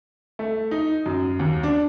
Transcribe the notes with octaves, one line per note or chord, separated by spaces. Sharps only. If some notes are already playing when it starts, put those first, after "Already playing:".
A3
D#4
F#2
D#2
D4